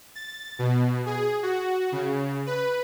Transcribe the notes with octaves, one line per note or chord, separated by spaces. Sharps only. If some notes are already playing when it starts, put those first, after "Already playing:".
A6
B2
G#4
F#4
C#3
B4